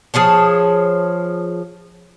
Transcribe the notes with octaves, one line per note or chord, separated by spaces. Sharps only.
F3 G#4 C#5 A5